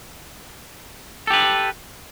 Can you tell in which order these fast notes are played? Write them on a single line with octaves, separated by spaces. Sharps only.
A4 G4 B4